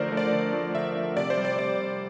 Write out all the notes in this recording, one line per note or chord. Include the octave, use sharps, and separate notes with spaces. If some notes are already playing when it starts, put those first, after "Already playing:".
Already playing: D3 F3 A3 A#4 C5 D5
F3 A3
D5
D3
F3 A3
D3 E5
F3 A3
C3 D5
C5
G3
D5
C3 D5